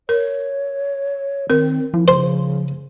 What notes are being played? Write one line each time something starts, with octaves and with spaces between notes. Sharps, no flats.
A#4 C#5
D#3 C4 A#4
F3 E4
C#3 C5